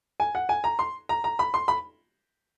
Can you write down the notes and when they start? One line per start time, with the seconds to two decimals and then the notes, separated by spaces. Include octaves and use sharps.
0.20 G#5
0.35 F#5
0.49 G#5
0.64 A#5
0.79 C6
1.09 A#5
1.24 A#5
1.39 B5
1.54 C6
1.68 B5